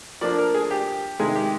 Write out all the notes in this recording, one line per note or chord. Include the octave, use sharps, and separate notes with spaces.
F3 A#3 D4 D5
A#4
G#4
G4
C3 D#3 G#3 G#4
G4